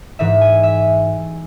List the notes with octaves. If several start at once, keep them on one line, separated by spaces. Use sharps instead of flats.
G#2 E3 E5
G#5
E5